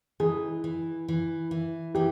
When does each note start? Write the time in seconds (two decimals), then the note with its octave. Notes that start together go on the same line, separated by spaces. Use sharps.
0.20 E3 G#4
0.64 E3
1.08 E3
1.51 E3
1.95 E3 G4